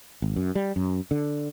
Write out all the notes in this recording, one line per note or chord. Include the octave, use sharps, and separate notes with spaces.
G#1
F#2
G3
F#2
D3